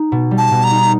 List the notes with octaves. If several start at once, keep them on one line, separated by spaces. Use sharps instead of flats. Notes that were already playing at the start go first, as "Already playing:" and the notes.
Already playing: D#4
B2
G3
A5
B2
A#5
D#4